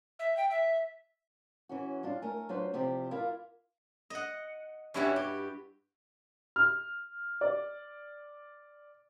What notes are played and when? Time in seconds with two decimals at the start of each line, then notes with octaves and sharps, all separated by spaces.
0.19 E5
0.37 G5
0.50 E5
1.69 E3 C#4 F#4
2.03 G2 D4 F4
2.22 A3 A#4 G#5
2.49 F#3 D4 F4 B4 C5
2.73 E2 C3 F3 G4 C5
3.11 E4 F4 A#4 D5 E5 F5
4.10 D#5 F#5
4.94 G2 E3 G3 C#4 E4 F#4
5.16 G4
6.56 F6
7.41 D5